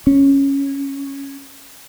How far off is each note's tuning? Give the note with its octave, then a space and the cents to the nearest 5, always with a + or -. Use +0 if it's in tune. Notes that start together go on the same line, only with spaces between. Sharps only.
C#4 -5